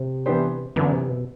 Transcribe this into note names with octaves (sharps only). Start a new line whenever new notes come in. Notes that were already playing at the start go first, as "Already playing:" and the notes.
Already playing: C3
E3 B3 D4 G4 C5
F#2 D3 E3 B3
C3
B2